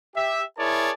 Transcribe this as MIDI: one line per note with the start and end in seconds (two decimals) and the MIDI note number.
0.15 0.42 67
0.15 0.42 76
0.58 0.91 64
0.58 0.91 68
0.58 0.91 70
0.58 0.91 73
0.58 0.91 74
0.58 0.91 81